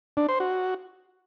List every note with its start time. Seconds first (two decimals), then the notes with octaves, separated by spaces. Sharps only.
0.17 D4
0.29 C5
0.40 F#4